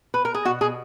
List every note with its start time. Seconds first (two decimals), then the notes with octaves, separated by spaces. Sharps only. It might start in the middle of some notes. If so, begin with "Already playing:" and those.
0.14 B4
0.25 A#4
0.34 G#4
0.45 B2 F#4
0.61 B2 G#4